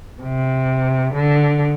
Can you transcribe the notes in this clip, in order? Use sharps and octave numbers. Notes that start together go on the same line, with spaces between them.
C3
D3